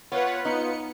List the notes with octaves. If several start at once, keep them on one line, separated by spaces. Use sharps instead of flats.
B3 F4 B4 C#5 F#5
B3 D#4 C#7